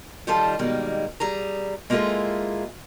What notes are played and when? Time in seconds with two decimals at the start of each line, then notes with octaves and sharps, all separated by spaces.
0.27 D#3 G3 F4 A4 A5
0.59 B2 D#3 G3 G#3 A#3
1.20 G3 G#4 A#5
1.90 G#3 A#3 E4 F4 G#4 A4